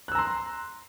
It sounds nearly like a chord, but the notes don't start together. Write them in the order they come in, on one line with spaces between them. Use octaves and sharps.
F#6 E6 A#5 C6